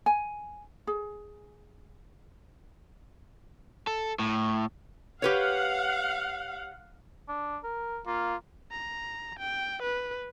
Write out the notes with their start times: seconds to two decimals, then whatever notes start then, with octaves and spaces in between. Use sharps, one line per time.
0.06 G#5
0.87 G#4
3.87 A4
4.19 A2
5.22 G4 B4 C#5 F5 F#5
7.29 D4
7.64 A#4
8.07 A#3 F4
8.72 A#5
9.39 G5
9.82 B4